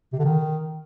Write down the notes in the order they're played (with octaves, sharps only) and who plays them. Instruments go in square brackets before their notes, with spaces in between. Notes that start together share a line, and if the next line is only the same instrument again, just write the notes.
[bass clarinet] C3
D3
D#3